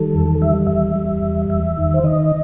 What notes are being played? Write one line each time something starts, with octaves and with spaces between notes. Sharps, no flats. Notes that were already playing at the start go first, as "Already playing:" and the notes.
Already playing: D#3 G3 A4
E2
G3 E5
E2 E5
G3
E2
E2 E5
D#3
C5
D#3 D#5